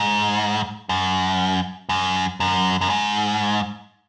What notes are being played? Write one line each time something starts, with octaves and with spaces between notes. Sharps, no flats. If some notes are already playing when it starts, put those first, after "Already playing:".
Already playing: G#2
F#2
F#2
F#2
F#2
G#2